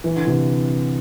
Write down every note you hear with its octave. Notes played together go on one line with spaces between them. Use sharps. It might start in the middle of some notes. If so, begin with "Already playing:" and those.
E3
D3
C3 E3